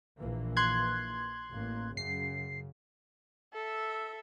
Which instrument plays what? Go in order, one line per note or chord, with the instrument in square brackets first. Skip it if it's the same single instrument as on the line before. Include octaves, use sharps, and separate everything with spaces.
[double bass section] A#1 E3 A#3
[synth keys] C6 F#6 G#6
[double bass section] A1 A#3
[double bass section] F#2 C#3 [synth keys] C7
[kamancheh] A4 E5